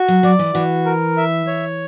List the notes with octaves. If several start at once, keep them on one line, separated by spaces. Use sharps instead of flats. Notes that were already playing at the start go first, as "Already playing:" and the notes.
Already playing: F#4
F#3
F#3 D5
E3
E3 F#4
A#4
E5
C#5